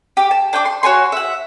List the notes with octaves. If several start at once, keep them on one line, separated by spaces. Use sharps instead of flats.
G4
A5
D4 G5 D6
C6
F#4 C#5 G#5 C6
E5 F#5